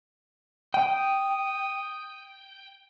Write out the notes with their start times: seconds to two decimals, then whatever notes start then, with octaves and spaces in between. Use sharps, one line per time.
0.74 G5 D#6